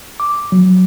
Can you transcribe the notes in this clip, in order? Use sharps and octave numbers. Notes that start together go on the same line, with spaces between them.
D6
F#3